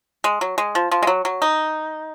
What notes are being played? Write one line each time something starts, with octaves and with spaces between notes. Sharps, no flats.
G#3
F#3
G#3
F3
F3
G#3
F#3
F#3
D#4